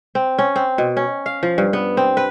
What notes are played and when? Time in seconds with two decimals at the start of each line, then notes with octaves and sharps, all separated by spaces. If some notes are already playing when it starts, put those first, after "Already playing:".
0.15 C4
0.39 C#4
0.56 C4
0.78 B2
0.97 C#4
1.26 F5
1.43 F3
1.58 G2
1.73 B3
1.97 C4
2.17 B4